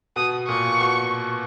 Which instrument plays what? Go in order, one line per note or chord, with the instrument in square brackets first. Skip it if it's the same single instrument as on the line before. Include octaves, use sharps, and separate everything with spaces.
[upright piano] B2 [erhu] D#6
[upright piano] A#2 [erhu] C#6
[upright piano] B2